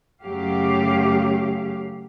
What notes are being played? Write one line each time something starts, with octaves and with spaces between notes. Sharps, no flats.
F#2 C#3 F#3 A3 G4 F5